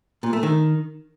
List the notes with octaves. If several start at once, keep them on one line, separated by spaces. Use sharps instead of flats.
A#2
A3
D#3